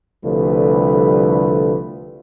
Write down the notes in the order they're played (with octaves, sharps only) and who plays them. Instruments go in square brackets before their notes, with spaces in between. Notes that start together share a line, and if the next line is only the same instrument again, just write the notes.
[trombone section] C2 D3 F3 G3 A3 B4